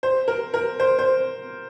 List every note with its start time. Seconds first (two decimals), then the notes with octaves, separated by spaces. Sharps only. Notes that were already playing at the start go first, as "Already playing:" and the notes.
0.03 C5
0.28 A#4
0.54 A#4
0.80 C5
0.99 C5